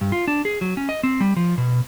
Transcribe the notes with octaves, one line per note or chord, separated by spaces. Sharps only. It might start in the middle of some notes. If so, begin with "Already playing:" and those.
G2
F4
D4
G#4
F#3
C#4
D#5
C4
G3
F3
B2